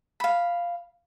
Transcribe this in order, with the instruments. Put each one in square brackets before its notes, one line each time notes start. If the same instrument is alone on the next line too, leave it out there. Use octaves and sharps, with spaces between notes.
[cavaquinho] F5 B5